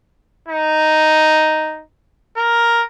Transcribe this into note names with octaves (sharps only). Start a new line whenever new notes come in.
D#4
A#4